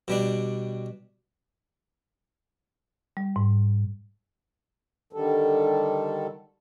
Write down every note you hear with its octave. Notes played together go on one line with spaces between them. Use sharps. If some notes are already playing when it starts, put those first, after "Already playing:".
B2 G3 D4
G3
G#2
D3 D#3 G3 A4